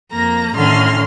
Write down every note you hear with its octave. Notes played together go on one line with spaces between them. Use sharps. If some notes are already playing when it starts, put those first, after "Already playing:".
F2 A#3 A#5 A#6
A2 D3 D#3 C#4 C6 F6